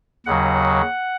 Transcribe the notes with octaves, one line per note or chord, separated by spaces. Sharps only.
D#2 C#3 F#3 F#5